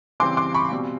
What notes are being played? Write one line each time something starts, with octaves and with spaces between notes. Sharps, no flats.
C#3 E3 G3 C4 C6 D6
C6 D6
B5 C#6
B2 G3 C4